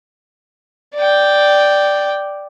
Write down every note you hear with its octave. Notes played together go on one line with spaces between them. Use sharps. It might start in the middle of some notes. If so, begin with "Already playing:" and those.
D5 G5